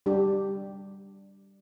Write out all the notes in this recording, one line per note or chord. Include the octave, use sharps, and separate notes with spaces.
G3 D4 G4